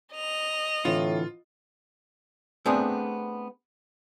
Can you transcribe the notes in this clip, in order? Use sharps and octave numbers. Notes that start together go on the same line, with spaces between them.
D#5 F7
A2 D3 E3 C4 F4
A3 B3 C4 D4 G#4